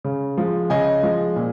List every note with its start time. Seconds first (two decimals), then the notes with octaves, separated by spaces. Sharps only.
0.04 C#3
0.38 F3 G#3
0.70 C#3 D#5 G#5
1.03 F3 G#3
1.36 A#2